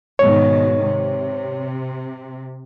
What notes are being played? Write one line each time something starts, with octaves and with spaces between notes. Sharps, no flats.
G#2 B2 D#3 C#5
C3